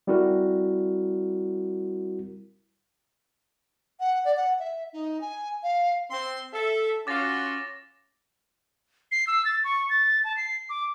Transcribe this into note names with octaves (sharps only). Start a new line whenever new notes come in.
G3 C4 E4 F#4 A#4
F#5
D5
F#5
E5
D#4
G#5
F5
C4 C6
A4 E5
C#4 F4 F#4 D6 A6 A#6
C7
E6
A6
C#6
A6
A5
C7
D6